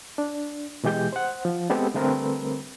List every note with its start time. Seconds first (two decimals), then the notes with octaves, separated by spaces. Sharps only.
0.18 D4
0.84 B2 E3 G#3 G4 G6
1.13 C5 F#5
1.45 F3
1.70 G#3 B3 C4 G4 A4
1.94 D3 G3 A3 C4 A#4 B4